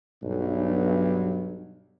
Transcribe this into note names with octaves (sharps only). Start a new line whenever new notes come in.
B1 G2